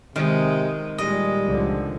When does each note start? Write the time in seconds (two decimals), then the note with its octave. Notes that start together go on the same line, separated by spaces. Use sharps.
0.16 C3 D#3 G#3
0.98 A#2 G3 G#3 D#5
1.45 C#2 D3 F3